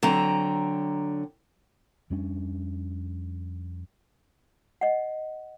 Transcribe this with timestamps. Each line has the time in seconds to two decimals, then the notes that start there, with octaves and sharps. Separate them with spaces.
0.03 D3 F#3 C4 A#5
2.10 F2 G3 C#4 D4
4.81 D#5 F#5